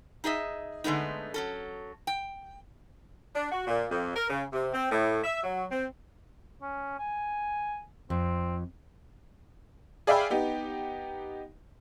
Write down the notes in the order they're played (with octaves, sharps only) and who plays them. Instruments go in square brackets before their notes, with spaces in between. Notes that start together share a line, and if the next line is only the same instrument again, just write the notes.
[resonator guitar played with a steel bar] D#4 G#4 D#5 E5
D3 G#3 A3 B3 D#4
F#3 C#4 A4
G5
[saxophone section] D4
F#4
A#2
F2
A#4
C#3
C3
C4
A2
E5
F#3
C4
[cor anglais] C#4
G#5
[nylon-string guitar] F2 [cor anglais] C4
[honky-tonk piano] G#4 D5 E5 F5 G5 B5
B3 D#4 G4